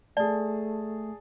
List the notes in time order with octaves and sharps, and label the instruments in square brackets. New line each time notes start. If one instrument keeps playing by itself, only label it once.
[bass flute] A3 [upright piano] G#4 A5 [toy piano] D5